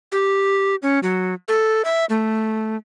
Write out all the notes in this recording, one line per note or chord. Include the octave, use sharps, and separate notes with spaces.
G4
C#4
F#3
A4
E5
A3